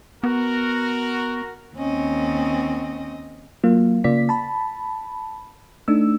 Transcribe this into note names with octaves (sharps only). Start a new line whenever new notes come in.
B3 F#4 A#4
D#2 C4 C#4 D#5
F#3 A#3 F4
C#3 A#3 F4 D5 B6
A5 B5
A3 D4 D#4 E6